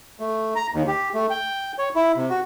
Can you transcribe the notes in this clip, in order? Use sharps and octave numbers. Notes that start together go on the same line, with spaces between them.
A3
A#5
D#2
G4
A3
G5
C#5
E4
C3
F#4